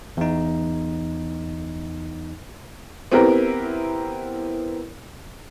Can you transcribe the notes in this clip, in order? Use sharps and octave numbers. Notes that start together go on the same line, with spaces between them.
E2 D#4
B3 C4 E4 G4 A#4